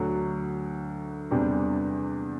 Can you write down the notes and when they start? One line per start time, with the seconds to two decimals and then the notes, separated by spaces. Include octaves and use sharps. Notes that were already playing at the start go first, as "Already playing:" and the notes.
Already playing: D2 D3 F#3
1.31 E2 C3 G3 D4